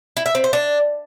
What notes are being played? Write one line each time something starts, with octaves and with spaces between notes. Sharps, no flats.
E4
E5
C4
C5
D4